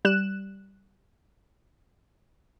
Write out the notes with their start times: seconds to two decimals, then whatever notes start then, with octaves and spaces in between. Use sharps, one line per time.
0.05 G3 F#6 E7